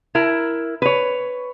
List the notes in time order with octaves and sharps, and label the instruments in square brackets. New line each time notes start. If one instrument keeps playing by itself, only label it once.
[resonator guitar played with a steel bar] E4 A#4
B4 C#5